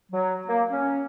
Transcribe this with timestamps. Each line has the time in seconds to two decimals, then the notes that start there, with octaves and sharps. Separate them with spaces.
0.12 F#3
0.46 A#3
0.70 C#4